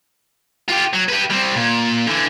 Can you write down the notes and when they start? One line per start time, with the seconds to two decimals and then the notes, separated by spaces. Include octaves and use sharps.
0.69 F4 G4
0.94 F#3
1.09 G4 B4
1.30 G3 C4
1.55 A#2
2.07 D3 E3